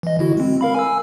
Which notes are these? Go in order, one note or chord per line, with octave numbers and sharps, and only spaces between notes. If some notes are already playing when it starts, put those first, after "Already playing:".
E3 D#5
D3 E4 F#4
G#3 C4
A#4 F5 B5
G#5 E6